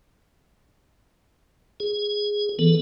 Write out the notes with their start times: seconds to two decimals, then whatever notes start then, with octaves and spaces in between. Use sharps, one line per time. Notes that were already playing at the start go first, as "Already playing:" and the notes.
1.80 G#4
2.59 E3 B3 A4